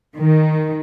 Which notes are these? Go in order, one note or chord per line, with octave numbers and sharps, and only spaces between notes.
D#3